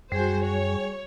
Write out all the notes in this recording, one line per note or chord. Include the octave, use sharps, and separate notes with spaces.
F#2 G3 F#4 G#4 C5 G#5
C#5